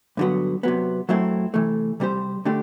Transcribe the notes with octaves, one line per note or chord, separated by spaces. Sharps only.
G2 D3 F#3 B3
C3 F#3 B3
F#2 F#3 A3 C4 E4
C3 E3 A3
C3 G3 C4 G4 C5
D3 A3 D4 G4